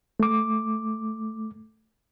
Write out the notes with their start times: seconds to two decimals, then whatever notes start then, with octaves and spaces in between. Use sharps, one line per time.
0.20 A3 D6